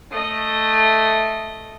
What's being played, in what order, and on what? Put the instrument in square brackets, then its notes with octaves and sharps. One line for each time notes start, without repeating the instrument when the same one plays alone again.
[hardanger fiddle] A3 D#5